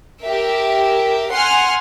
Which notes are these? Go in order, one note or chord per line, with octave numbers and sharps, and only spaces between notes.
G4 A#4 E5
F#5 G#5 C6 F6